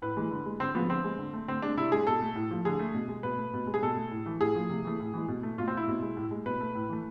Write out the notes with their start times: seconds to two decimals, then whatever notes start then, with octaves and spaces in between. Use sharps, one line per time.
0.02 A2 B4
0.17 E3 G#3
0.31 D3
0.46 G#3
0.60 D3 C4
0.75 F3 G#3 B3
0.89 D3 C4
1.04 G#3
1.19 D3
1.33 A3
1.48 D3 C4
1.62 G#3 D4
1.77 C3 E4
1.92 G#3 G#4
2.07 B2 A4
2.22 A3
2.36 A2
2.51 F3 A3
2.65 D3 G#4
2.79 A3
2.94 B2
3.09 G#3
3.23 B2 B4
3.38 A3
3.53 B2
3.67 G#3
3.74 G#4
3.82 B2 A4
3.97 A3
4.11 A2
4.26 E3 A3
4.41 A2 G#4
4.55 F3 A3
4.69 C3
4.85 E3 A3
5.00 A2
5.14 E3 G#3
5.28 B2
5.43 A3
5.58 B2 F4
5.68 C4
5.72 A3 E4
5.88 B2
6.02 G#3
6.17 A2
6.31 G#3
6.46 B2 B4
6.60 A3
6.75 A2
6.89 E3 A3